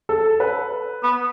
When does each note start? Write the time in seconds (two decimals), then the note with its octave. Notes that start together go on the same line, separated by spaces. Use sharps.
0.09 A4
0.40 B4
1.03 B3